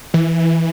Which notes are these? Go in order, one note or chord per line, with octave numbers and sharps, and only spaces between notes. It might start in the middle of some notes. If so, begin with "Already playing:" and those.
E3